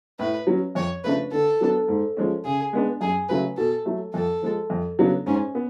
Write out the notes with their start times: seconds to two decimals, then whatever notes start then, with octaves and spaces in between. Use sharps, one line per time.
0.19 A2 B4
0.47 F#3 C#4
0.75 F2 C#5
1.04 C#3 F3 A3 D4 B4
1.32 D3 A4
1.61 F#3 B3 D4
1.88 G#2
2.17 F3 G#3 C#4
2.45 C#3 G#4
2.73 G#3 B3 D4
3.01 F#2 G#4
3.29 C#3 F#3 A3 B4
3.57 B2 A4
3.86 F#3 A3
4.14 F2 A4
4.42 F3 G#3
4.70 F2
4.99 C#3 F#3 B3 D4
5.26 G#2 C#4
5.55 B3